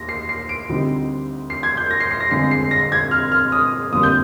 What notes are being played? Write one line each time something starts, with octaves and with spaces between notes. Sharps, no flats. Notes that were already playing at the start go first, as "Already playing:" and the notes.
Already playing: D#2 A#6
C7
C7
D7
D2 D3 G3 C4 D#4
C7
G#6
G6
A#6
C7
C7
A#6
G1 F2 D3 G#3 C7
C7
A#6
G#6
F6
F6
D#6
G1 F2 D3 G3 A#3 D#6
G6